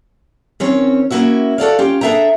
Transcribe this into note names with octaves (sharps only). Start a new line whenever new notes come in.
D#3 C4 C#4 C#5
A#3 C#4 E4 F#4 E5
F#4 A4 D5 F5
C#4 F4 G4
D4 G#4 A4 E5 G5 A#5